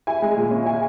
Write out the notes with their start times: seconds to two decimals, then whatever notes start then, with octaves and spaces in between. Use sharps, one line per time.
0.07 E4 G#5
0.22 G#3
0.37 A#2
0.51 C#4
0.66 E4 G#5